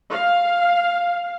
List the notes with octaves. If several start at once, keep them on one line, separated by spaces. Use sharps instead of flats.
F5